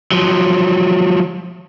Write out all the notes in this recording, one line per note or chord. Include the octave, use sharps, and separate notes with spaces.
F3 F#3